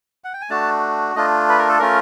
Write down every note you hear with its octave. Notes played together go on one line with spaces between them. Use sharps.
F#5
G5
G#5
A3 D4 F#4 A5
A3 D4 F4 D#5
B4
A#4
A4
A3 C#4 F4 A#4